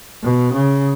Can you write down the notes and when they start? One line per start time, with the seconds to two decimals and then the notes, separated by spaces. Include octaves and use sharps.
0.22 B2
0.53 C#3